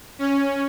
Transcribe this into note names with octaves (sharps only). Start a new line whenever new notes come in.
C#4